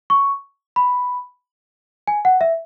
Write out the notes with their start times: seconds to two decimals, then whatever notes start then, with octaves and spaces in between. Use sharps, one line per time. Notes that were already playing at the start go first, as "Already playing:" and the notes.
0.10 C#6
0.76 B5
2.08 G#5
2.25 F#5
2.41 E5